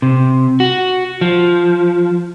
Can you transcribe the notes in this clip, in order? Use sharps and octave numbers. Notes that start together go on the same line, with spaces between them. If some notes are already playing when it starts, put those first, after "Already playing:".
C3
F#4
F3